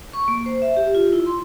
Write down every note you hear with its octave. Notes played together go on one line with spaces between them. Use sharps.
C#6
A#3
C5
E5
G4
F4
E4
C6